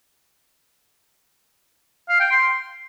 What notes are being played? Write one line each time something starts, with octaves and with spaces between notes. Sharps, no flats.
F5
G5
C6